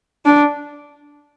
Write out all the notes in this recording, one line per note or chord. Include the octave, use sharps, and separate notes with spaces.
D4